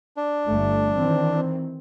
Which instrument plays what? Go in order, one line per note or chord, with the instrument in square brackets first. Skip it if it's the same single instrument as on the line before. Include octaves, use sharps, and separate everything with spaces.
[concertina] D4
[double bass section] G1 A3
D#3 E3 C4